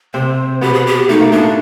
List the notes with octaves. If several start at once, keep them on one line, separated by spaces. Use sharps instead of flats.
C3 C4 C5
B2 B3 G4
G#4
G4
A3 D#4
A#3
A2 A3 D4